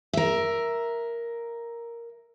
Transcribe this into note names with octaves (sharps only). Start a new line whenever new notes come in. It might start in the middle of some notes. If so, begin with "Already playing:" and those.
A#4 E5